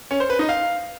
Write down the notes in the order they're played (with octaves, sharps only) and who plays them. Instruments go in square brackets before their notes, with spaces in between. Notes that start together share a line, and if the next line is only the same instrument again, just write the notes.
[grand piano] C#4
C5
B4
D#4
F5